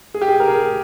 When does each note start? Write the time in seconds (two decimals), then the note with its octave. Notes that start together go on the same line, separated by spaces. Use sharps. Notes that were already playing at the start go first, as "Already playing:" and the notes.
0.14 G#4
0.21 G4
0.28 G#4
0.40 A#4
0.48 G#4